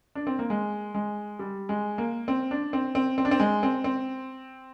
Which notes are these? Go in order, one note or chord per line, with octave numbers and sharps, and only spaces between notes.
D4
C4
A#3
G#3
G#3
G3
G#3
A#3
C4
D4
C4
C4
C4
D4
C4
G#3
C4
C4